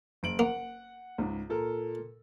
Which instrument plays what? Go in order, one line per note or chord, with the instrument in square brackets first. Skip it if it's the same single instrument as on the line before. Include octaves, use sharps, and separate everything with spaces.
[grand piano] F#1 D7 F#7
[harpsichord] A#3 [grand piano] F#5
[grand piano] C#2 G#2
A#2 A4 A#4